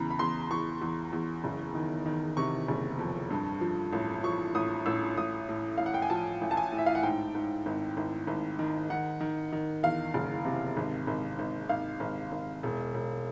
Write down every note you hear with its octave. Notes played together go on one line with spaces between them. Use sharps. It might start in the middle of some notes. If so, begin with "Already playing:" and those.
Already playing: E2 C#3 A#5 B5
B5
E2 C6
E2 C#6
E2
E2
F#1
D#3
D#3
C3 C#6
F#1
F2
G2
F3
A1
F3 C#6
A1 D#6
A1 E6
A1 D#6
A2
A2 F5
F#5
G5
G#5
F3 A5
A1
A5
G#5
A2
E5
F5
F#5
G#2 G5
G#2
G#1
G#1
G#1
D#3
D#3 F#5
D#3
D#3
E2 F5
F#1
C3
G#1
G#1
G#1
G#1 F5
G#1
G#1
E1
E1